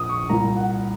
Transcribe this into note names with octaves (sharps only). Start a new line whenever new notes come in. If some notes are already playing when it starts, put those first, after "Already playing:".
Already playing: A#1 A#2 D#6
C#6
C2 A#2 A#5
F#5